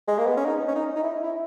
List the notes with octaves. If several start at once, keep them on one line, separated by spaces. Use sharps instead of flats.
G#3
A#3
B3
C#4
D#4
C#4
D#4
D#4
E4
E4